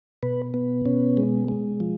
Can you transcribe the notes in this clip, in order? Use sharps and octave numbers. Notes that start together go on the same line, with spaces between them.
B2 B4
B3
B2 C#4
G#3
G#3
F3